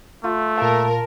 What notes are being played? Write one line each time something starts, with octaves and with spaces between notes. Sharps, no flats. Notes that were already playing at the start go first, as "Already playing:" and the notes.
A3 F4
A#2 A#4 F5 A5